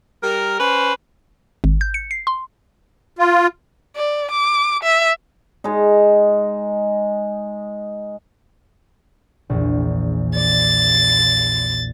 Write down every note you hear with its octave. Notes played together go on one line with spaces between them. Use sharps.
G3 A#4
C#4 B4 C5
G#1
G6
C#7
C7
C6
F4
D5
D6
E5
G#3 D#4
A#1 E2
D5 A6